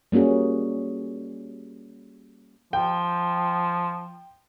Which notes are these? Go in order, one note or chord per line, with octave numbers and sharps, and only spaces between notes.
G3 A#3 C#4 F#4 G#4
F3 G5